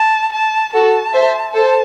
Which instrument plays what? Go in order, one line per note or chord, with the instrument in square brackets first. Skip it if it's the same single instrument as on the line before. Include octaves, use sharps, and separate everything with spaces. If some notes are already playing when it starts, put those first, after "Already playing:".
Already playing: [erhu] A5
A5
[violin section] F#4 A4 [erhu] A5
[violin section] C5 E5
[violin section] A4 C5 [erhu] A5